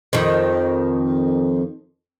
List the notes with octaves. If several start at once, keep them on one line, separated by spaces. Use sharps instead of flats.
F2 D#3